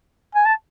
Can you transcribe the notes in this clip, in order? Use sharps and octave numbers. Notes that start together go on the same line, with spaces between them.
G#5
A5